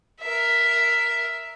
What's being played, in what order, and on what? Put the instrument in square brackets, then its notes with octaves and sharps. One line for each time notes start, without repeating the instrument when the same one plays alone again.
[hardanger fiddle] A#4 E5